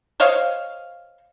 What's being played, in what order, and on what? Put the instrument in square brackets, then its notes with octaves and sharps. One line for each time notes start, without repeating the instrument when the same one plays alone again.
[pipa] C5 C#5 D#5 F5